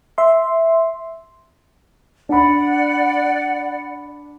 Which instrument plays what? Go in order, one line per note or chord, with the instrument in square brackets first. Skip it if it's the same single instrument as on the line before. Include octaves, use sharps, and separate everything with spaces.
[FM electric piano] E5 C6
[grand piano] D4 B5 [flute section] D5 F#5